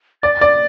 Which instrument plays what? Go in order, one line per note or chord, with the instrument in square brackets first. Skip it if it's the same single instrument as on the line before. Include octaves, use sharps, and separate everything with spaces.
[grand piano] D5 [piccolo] A6
[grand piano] D5